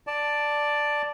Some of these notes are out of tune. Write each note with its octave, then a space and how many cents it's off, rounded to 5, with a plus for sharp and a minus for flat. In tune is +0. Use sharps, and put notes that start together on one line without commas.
D5 +0 A5 +0